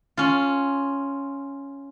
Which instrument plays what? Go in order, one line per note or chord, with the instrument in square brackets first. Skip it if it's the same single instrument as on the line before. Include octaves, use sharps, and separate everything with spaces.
[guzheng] C#4 F4